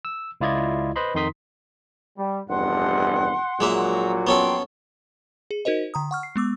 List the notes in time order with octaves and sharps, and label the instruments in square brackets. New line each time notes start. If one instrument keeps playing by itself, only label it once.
[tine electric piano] E6
C#2 E4 F4 D5 D#5 G#6
B4 C5 D#5 B5 C6
F2 D#3 D#4 C6 D#6 B6
[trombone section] G3
[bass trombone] F1 [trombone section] E2 G2 [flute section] F#5 C6 F#6
[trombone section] A#1 F#3 [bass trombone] A#2 [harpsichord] G#3 A#3 E5
[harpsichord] B3 C#4 A4 [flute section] G5 A#5 C6
[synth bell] G#4
D#4 F#4 A#4 C5 D#5
D3 A#5 D#6
F#5 C#6 F6
C7
G#3 B3 D6 E6